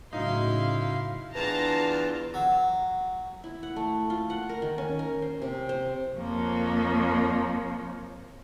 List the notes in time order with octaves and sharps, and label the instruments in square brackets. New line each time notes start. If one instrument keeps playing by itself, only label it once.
[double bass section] A2 C#3 [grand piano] F#3 D#4 [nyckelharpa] E4 C6 [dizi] F5
[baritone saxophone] E2 [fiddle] D4 F4 [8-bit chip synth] B4 [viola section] A5 A#5
[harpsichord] F#3
[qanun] E4
F#5
A3
F4
F#5
A#4
D#3
C#4
A#4
C5
C3
C5
[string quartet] F2 F3 [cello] A#3 C#5